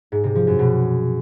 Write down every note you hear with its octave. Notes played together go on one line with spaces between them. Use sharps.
G#2
C3
F3
F#2
B2